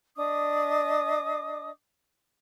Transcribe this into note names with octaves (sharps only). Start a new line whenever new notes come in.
D4 D#5 D6 D#6